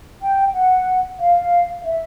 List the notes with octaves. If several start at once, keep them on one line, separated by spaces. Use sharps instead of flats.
G5
F#5
F5
F5
E5